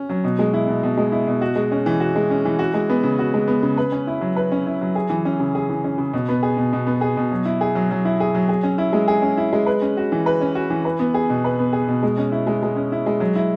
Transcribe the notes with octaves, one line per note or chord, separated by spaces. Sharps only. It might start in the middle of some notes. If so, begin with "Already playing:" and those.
Already playing: C#4
F#3
B2
G#3
E4
B2
B2
G#3
E4
B2
F#4
G#3
C#4
E3
F#4
G#3
C#4
E3
F#4
G#3
B3
C#3
F#4
G#3
B3
C#3
B4
C#4
E4
F#3
B4
C#4
E4
F#3
G#4
E3
C#4
C#3
G#4
E3
C#4
C#3
B2
B3
G#4
B2
B2
B3
G#4
B2
F#3
E4
G#4
F#3
F#3
E4
G#4
F#3
G#4
C#4
E4
G#3
G#4
C#4
E4
G#3
B4
C#4
F#4
E3
B4
C#4
F#4
E3
B4
B3
G#4
B2
B4
B3
G#4
B2
G#3
C#4
E4
G#3
G#3
C#4
E4
G#3
F#3
E4